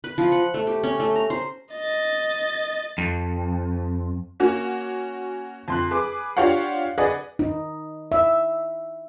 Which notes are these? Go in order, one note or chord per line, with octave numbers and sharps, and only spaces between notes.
B4
F3
F#5
A3
G4
C#4
A3
A#5
C5
D#5 A6
F2
A#3 C#4 F#4
F2 C6 F#6
G#4 B4 D6
D4 F4 G4 C#5 F5 F#5
G#4 B4 D5 D#5 F#5
D#4
E5